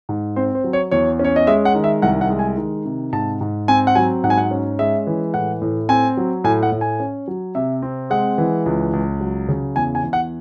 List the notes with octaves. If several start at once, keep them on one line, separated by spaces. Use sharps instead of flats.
G#2
C4 C5
C5
F#3
C#5
E2 C#5
C#4
C#5
D#5
G#3 E5
F#5
D#3
E5
C2 F#5
F#5
G#3
G#5
D#3
C3
G#2 A5
G#2
C4 G#5
F#5
F#3 G#5
G#2 F#5
G#5
F#5
C#4
G#3 E5
E3
A2 F#5
A2
C4 G#5
F#3
A2 G#5
F#5
A2
G#5
C#4
F#3
C3 E5
C4
G#3 F#5
E3
C#2
C#2
F#3
C#3
E2 G#5
G#5
E2
F#5